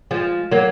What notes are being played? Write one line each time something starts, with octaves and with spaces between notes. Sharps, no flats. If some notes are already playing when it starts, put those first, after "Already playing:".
F3 G#3
F#3 A#3